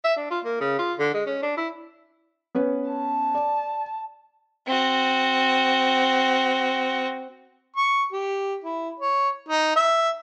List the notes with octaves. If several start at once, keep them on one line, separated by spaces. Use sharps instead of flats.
E5
D4
F4
A#3
C#3
F4
D3
G#3
C#4
D4
E4
B3 C#4 B4
A5
D5
C4 F#4
C#6
G4
E4
C#5
D#4
E5